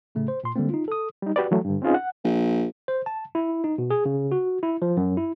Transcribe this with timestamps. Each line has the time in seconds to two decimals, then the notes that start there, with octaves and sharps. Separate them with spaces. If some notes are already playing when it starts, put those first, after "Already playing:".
0.15 A2 C#3 A3
0.28 C5
0.44 A#2 C6
0.56 D3 G3 G#3 A#3 C4
0.70 D#4 F4
0.88 A4 D#6
1.22 G3 D#4
1.36 F#4 G4 B4 D5
1.51 E3 F#3 A3
1.65 G2 D3
1.82 C4 C#4 D#4 F4 G#4 D#5
1.94 F#5
2.24 A#1
2.88 C5
3.06 A5
3.35 E4
3.64 D#4
3.78 B2
3.90 G#4
4.06 C#3
4.32 F#4
4.63 E4
4.82 F3
4.97 F#2
5.17 E4